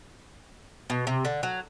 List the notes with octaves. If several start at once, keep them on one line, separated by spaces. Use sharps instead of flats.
B2
C3
D3
F#3